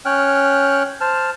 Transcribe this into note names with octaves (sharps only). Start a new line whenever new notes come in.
C#4 C#5 G5 F6 F#6
C5 A5 F6